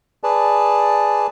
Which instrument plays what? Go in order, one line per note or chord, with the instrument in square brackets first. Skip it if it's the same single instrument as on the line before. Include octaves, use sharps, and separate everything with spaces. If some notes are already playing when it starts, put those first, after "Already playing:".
[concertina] G#4 B4 D5 A5